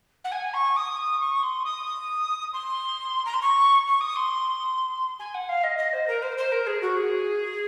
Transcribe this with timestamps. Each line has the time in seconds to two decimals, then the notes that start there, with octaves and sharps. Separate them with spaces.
0.25 F#5
0.32 G#5
0.54 C#6
0.77 D#6
1.20 C#6
1.43 C6
1.65 D#6
2.53 C6
3.26 A#5
3.34 C6
3.42 C#6
3.87 C#6
4.01 D#6
4.16 C6
5.19 G#5
5.35 F#5
5.49 F5
5.64 D#5
5.78 D#5
5.93 C5
6.08 A#4
6.22 C5
6.38 C5
6.52 A#4
6.67 G#4
6.82 F#4
6.97 G#4